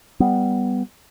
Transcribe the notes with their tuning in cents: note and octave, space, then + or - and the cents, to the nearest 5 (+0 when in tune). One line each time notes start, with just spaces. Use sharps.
G3 +0 B3 +0